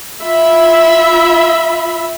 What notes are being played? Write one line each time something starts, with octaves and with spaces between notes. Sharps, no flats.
F4 E5 B5